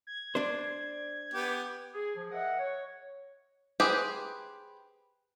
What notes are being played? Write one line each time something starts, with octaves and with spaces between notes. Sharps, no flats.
G#6
D4 C5
B3 G4
G#4
F3
A#4 D#5 E5 F#5
C#5
G4 G#4 B4 C5